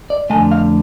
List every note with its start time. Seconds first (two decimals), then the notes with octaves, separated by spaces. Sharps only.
0.10 D5
0.30 F2 D3 F3 A3 G#5
0.51 F5